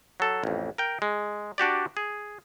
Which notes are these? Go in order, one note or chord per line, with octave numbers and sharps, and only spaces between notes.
F#3 A4
A1 F2
A#4 G5
G#3
D4 F#4 G4 D5
G#4